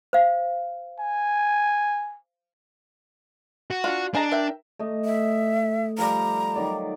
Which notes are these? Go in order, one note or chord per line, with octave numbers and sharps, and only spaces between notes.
C5 F5
G#5
F#4
D4 F4
D4 G#4 D#5 A#5
A#4 E5 G5
A3 D#5
E5
F3 G3 A#5
D#3 F#3 D5